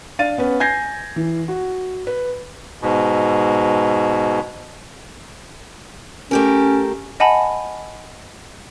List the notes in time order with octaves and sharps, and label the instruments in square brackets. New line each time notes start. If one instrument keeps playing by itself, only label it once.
[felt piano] D4 F5 A6 D#7
B3 C#4 B4
G#5 G6 G#6 A#6 C7
E3
F#4
B4
[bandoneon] G#2 B2
[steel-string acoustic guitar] A3 G4 A#4 [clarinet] C#4
[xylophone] D#5 F#5 G#5 A5 B5